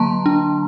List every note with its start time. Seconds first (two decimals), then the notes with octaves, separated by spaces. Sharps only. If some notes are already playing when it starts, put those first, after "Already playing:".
Already playing: D3 F#3 A#3 A5 A#5 C6
0.26 D4